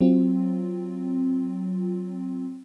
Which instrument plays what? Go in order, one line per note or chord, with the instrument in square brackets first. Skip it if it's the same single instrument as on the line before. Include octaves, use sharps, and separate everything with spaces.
[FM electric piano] F#3 C4 F4